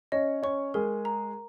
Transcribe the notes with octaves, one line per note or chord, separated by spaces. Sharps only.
C#4 C#5 D#5
C#4 C#5 C#6
G#3 G#4 A#4
A#5